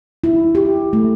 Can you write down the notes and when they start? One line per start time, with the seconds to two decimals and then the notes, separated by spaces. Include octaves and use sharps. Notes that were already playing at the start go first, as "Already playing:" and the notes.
0.24 E4
0.55 G4
0.93 A3